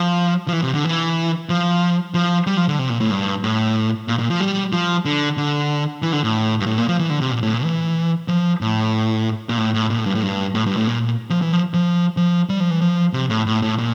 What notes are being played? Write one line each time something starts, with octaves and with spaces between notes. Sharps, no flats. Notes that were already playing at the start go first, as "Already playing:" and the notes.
Already playing: F3
F3
E3
C3
D3
E3
F3
F3
G3
F3
D3
C3
A#2
A2
G2
A2
A#2
A#2
F3
G3
F3
D3
D3
E3
D3
A2
G2
A2
A#2
F3
E3
D3
C3
A#2
A2
A#2
E3
F3
A2
A#2
A2
A2
A#2
A2
G2
A2
G2
A2
G2
A2
A#2
F3
E3
F3
F3
F3
G3
F3
E3
F3
C3
A2
A2
A2
A#2